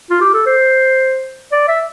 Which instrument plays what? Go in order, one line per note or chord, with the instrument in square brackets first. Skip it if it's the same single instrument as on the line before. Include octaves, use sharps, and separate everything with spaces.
[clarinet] F4
G4
A4
C5
D5
E5